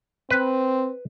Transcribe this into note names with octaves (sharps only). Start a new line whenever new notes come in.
C4 B4